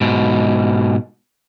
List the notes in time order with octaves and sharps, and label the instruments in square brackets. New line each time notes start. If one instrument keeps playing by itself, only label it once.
[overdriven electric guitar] G#2 B2